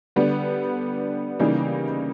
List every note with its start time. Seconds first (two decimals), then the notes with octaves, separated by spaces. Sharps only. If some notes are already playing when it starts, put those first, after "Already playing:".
0.16 D3 G3 B3
1.39 C#3 E3 G3 A#3 D#4